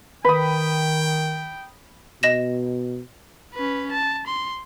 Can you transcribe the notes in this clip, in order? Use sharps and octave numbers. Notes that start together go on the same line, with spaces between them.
D#3 B4 G5 B5 D#6
B2 D#5 A#6 E7
C#4 B4
A5
C6